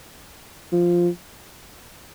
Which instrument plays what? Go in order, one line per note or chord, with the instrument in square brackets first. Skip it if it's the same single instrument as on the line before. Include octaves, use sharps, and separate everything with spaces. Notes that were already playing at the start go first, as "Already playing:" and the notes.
[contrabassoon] F3